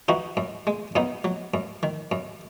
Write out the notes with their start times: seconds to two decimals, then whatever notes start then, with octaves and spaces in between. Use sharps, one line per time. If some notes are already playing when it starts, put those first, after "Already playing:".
0.08 E3 D#4 F#4
0.37 F#2
0.67 G#3
0.95 F#2 B3 D#4
1.24 F#3
1.54 F#2
1.83 D#3
2.12 F#2